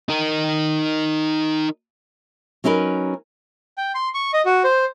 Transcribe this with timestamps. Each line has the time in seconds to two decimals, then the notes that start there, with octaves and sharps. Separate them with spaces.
0.09 D#4 A#4
2.64 F#3 C#4 D#4 A#4 B4
3.78 G5
3.95 C6
4.14 C#6
4.33 D#5
4.45 F#4
4.64 C5